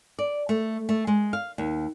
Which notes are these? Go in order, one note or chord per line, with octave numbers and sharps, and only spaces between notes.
D5
A3
A3
G#3
F5
D#2